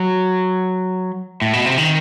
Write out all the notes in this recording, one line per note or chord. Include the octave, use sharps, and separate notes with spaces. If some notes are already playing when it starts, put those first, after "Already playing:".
Already playing: F#3
A2
B2
C3
D#3